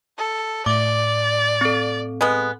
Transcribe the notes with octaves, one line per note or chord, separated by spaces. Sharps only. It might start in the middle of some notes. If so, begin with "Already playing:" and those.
A4
A2 D5 D6
C4 A4
G#3 B3